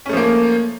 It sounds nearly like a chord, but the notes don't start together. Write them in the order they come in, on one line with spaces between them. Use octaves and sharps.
C#4 A3 F3 A#3